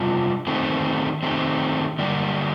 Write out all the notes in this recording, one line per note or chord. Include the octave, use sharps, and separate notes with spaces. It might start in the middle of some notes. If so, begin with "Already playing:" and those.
Already playing: C3 G3 D4 F4
D#3 A3 C4 G4
D#3 A3 C4 G4
D3 G3 A#3 D4 G4